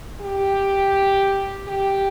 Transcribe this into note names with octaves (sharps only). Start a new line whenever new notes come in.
G4
G4